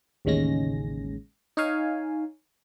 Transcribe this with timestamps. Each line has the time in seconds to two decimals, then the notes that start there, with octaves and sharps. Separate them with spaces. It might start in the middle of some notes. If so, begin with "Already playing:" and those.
0.25 A1 D#2 C#3 G#3 C#4 A#6
1.57 D#4 C#5 F5 G#5